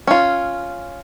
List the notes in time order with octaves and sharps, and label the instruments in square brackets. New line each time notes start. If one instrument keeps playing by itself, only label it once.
[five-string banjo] C#4 F4